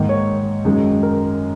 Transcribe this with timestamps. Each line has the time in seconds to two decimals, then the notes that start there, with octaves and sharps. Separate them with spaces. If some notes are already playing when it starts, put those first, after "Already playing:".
Already playing: G#2 D#3 A#3
0.09 C#5
0.65 F#2 D#3 G#3
1.03 A#4